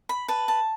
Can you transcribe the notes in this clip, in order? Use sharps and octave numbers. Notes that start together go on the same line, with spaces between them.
B5
B4 A5
A5